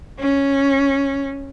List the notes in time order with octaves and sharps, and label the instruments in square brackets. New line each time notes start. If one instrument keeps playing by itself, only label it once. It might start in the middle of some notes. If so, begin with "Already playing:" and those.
[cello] C#4